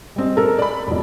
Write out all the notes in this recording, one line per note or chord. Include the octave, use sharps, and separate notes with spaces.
G3 C4 D#5
A4 A#4
D5 B5
E1 F2